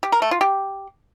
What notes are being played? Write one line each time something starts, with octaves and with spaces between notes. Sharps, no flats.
G4
A#4
A3
F4
G4